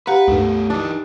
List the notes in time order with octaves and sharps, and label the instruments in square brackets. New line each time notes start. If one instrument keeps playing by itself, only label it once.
[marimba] G4 F5 A#5 [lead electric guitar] B4 [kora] F#5
[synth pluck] C#2 G2 [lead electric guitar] B2 A3
[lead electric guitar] E3 D#4 [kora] D4